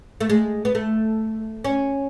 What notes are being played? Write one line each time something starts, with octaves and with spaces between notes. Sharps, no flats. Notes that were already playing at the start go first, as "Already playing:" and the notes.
A3
G#3
B3
A3
C#4